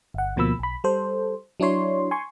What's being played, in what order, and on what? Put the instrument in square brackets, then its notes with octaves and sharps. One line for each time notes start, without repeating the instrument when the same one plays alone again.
[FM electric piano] G1 F#5
D2 B2 F3 A#3 B5 E6
B1 B5
G3 A4 C5
F#3 D4 E4 C#5 C6
G#5 C6 C#6